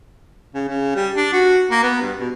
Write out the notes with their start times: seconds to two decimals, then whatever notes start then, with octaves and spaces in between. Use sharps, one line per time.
0.55 C#3
0.68 C#3
0.96 G3
1.17 D4
1.33 F#4
1.71 A#3
1.83 B3
2.01 G2
2.20 B2